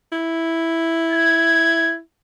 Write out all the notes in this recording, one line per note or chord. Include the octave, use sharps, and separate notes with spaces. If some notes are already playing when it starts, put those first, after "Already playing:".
E4
G#6